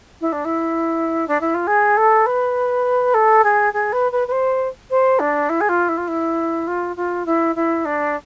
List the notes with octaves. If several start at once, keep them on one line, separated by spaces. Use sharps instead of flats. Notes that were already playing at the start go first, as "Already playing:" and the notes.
E4
D4
E4
D4
E4
F4
G#4
A4
B4
A4
G#4
G#4
B4
B4
B4
C5
C5
D4
E4
G#4
F4
E4
F4
E4
F4
F4
E4
E4
D4